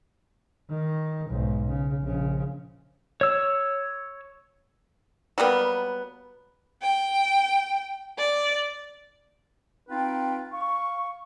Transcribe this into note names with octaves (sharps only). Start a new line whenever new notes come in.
D#3
B1 G#2
C#3
A#1 C#3
C#5 E6
F#3 G3 A#3 B3
G5
D5
C4 D#4 F4 B4 G5
F5 C#6